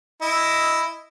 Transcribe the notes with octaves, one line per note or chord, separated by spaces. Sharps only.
E4 D#5